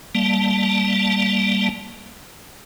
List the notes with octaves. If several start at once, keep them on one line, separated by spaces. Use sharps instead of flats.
G3 A#3 A5